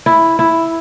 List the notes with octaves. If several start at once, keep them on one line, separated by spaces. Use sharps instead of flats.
E4
E4